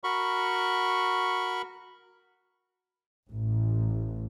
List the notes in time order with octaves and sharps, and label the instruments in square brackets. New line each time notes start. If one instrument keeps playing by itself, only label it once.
[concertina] F#4 A#4 B5 C#6
[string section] A1